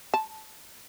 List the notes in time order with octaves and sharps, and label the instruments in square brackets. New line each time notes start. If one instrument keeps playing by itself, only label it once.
[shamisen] A5